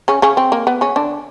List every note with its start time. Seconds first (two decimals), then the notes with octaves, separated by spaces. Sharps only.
0.08 C#3 C#4
0.22 C#3 C#4
0.37 C4
0.52 A#3
0.67 B3
0.81 C#3 C#4
0.96 D3 D4